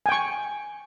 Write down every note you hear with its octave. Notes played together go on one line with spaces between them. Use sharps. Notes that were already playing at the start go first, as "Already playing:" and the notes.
G5 G#5 C#6